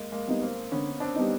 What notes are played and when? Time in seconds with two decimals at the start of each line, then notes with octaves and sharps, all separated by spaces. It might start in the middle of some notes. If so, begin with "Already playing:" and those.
Already playing: G#3 A#3
0.12 G#3 A#3
0.27 G3 B3 D#4
0.42 A#3 C4
0.72 D3 B3 C#4
1.00 C4 D4
1.16 G3 B3 D#4